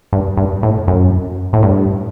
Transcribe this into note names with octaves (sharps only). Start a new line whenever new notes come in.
G2
G2
A2
F#2
A2
G2